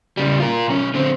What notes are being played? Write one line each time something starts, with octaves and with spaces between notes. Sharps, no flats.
C#3 G3
F4 A#4
B1 C#4
D3 C4